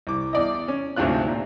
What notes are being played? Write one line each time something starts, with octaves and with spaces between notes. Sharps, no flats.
C2 D6
E2 D5 D#5
C#4
G#1 D2 C3 D4 F4 F#6
A#2